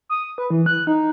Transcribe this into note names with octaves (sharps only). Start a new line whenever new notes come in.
D#6
B4
E3
F#6
D#4